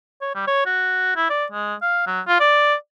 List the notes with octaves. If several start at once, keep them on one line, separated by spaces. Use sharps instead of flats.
C#5
G3
C#5
F#4
E4
D5
G#3
F5
F#3
F4
D5